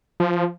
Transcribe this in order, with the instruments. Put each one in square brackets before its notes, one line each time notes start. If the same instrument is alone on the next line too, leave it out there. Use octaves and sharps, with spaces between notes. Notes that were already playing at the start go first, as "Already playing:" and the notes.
[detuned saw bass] F3